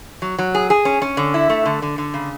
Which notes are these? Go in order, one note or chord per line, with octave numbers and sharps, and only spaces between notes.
F#3
F#3
G#4
G#4
C#4
C#4
D3
E4
A3
D3
D3
D3
C#3